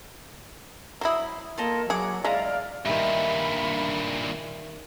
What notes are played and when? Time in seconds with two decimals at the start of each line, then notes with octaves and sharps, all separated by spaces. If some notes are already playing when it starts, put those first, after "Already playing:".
1.01 F#3 E4 C5 B5 D#6
1.58 A#3 F4 A4 D#5
1.90 F#3 G#4 F#5 D6
2.24 G#3 E4 D5 F5 A#5
2.85 G2 A#2 D#3 G3 E5 B5